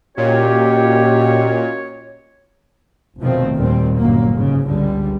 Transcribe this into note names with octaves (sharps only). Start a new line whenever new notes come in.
A#2 C#4 F#4 G4 C#5 D#5
F1 B2 D#3 F3 A3 C4
D#2 A#2 G3 C4
G1 F#2 A#2 F#3 A#3
G#2 C#3
G1 C#2 D3 G3